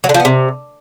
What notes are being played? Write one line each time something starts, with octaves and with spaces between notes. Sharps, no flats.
F#3
D3
F3
B3
C3